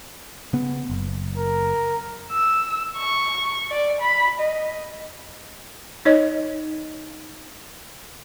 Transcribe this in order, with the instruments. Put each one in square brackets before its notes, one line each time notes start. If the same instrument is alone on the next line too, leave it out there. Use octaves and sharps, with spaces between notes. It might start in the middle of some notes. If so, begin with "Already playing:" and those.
[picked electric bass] C#3 B3
F#1
[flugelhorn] A#4
[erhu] E6
C#6
D5
B5
D#5
[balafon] D#4 C#5 D#5